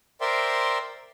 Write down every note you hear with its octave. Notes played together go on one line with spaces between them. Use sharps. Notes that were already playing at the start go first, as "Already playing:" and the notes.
A#4 C5 D5 E5 G5 C6